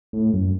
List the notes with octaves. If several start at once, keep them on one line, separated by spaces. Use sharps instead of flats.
A2
F#2